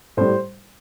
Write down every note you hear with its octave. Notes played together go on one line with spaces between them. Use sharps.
A2 G3 C5